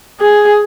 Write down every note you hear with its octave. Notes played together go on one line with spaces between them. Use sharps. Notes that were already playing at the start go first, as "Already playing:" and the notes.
G#4